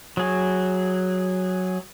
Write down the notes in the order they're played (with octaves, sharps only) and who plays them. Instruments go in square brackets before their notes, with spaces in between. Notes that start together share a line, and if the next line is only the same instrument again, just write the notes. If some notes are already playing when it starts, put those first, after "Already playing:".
[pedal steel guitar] F#3 G#4